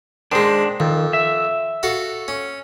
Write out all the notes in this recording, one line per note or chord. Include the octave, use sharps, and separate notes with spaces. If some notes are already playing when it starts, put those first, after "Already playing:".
D#3 G#3 D4 C5
F2 D#3
E5
F#4 A4 F5
C#4